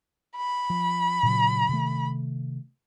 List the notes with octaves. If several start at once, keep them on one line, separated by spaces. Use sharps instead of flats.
B5
F3
A#2 C#3 F#3
C3 D#3 A3